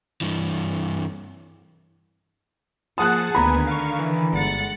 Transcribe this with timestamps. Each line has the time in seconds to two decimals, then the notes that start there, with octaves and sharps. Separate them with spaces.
0.21 G2 E3
2.98 F3 A#3 G#4 F#5 A5 D#6 F#6
3.35 D2 D3 D#3 B3 G#5 A#5 B5
3.67 F5 C#6
3.99 E3
4.33 G1 G#3 F#5 A6